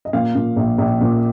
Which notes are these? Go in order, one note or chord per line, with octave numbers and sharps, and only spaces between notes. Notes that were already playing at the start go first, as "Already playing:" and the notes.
D#5
A#2 F5
A#2
A#1
A#1
A#2